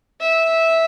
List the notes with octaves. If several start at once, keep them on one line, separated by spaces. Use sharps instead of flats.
E5